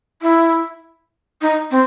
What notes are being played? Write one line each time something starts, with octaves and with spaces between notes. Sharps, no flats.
E4
D#4
C4